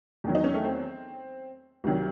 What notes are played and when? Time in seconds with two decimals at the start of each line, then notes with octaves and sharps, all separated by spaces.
0.24 E2 D#3 F#3
0.35 D#4
0.44 C#4
0.54 A3
0.64 C4
1.84 C2 C3 D#3 F#3